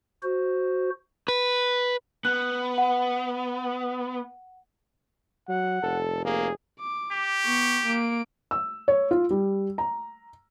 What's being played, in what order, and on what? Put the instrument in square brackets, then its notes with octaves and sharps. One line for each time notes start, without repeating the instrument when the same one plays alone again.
[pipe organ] F#4 C5
[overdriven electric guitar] B4
[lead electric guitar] B3 [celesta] F#6
[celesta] F#5
[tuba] F#3 [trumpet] F#5
[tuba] F1 [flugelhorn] A4
[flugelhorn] A#3 [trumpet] G#4
[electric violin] D6
[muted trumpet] G4
[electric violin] B3 C#6
A#3 D7
[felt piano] E6
C#5
F4
G3
A#5